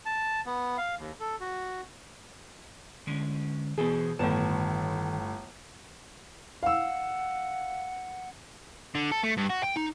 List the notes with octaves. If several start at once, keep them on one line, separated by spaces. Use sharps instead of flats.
A5
B3
F5
D#2
A4
F#4
D3 G#3 C#4
B2 E3 G#4 A4 C5
G1 A2 D#3 A5
F5 F#5 E6
D3
A4
A3
G2
F#4
G5
D#4